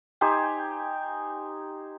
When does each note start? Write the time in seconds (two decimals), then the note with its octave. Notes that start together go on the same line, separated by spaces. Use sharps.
0.21 D#4 G4 C5 G#5